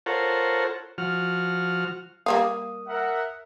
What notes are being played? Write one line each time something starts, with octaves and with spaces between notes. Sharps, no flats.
F4 A4 A#4 C5 C#5 F#5
F3 F#4 F6
G3 A#3 F5 D#6
A#4 E5 F#5